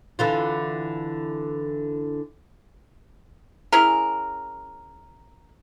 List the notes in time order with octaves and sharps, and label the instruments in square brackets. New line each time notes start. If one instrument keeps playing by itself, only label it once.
[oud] D3 E3 F4
[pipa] C#4 E4 G#4 A#4